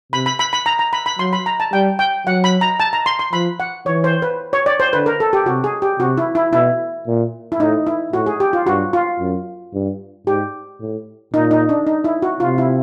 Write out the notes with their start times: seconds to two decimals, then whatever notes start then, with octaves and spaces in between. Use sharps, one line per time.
0.12 C3 B5
0.26 B5
0.39 B5
0.53 B5
0.66 A#5
0.79 A#5
0.93 B5
1.06 B5
1.19 F#3 C6
1.33 B5
1.46 A#5
1.60 A5
1.73 G3 G5
1.99 G5
2.26 F#3 F#5
2.44 B5
2.61 A#5
2.80 A5
2.93 A#5
3.06 C6
3.19 C6
3.33 F3 B5
3.60 F#5
3.86 E3 C#5
4.04 C5
4.22 B4
4.53 C#5
4.66 D5
4.80 C5
4.93 D3 B4
5.06 A#4
5.20 A4
5.33 G4
5.46 C3 F#4
5.64 G#4
5.82 G4
6.00 C3 F#4
6.18 E4
6.35 E4
6.53 B2 E4
7.07 A#2
7.52 E4
7.60 A2 D#4
7.87 E4
8.13 A2 F#4
8.26 G#4
8.40 G4
8.53 F4
8.67 G2 F#4
8.93 F4
9.20 F#2
9.73 G2
10.26 G#2 G4
10.81 A2
11.33 A#2 D#4
11.51 D#4
11.69 D4
11.87 D#4
12.04 E4
12.22 F#4
12.40 C3 F4
12.58 E4